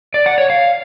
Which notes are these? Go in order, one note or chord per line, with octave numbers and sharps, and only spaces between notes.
D5
F#5
C#5
F5